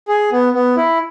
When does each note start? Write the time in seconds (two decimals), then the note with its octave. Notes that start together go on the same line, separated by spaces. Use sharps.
0.08 G#4
0.32 B3
0.54 B3
0.77 E4